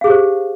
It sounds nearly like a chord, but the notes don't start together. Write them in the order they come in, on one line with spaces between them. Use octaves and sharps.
F5 G#4 G4 C5